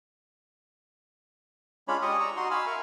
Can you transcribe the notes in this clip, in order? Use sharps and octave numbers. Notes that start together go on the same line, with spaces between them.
G#3 C#4 D4 F4 C#5 B5
G4 D5 D#5 C#6 D#6
A#5 C#6 E6
D#4 F#4 C6
F5 G#5 B5 E6
A#4 E5 C#6